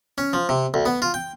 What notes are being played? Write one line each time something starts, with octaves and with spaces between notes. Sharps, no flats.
C#4
F3
C3
D2
B3
F4
G5